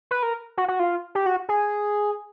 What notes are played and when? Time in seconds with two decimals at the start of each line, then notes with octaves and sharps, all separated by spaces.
0.11 B4
0.23 A#4
0.57 F#4
0.68 F#4
0.80 F4
1.15 G4
1.26 F#4
1.49 G#4